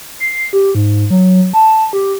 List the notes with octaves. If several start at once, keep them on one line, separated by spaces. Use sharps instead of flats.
C7
G4
G#2
F#3
A5
G4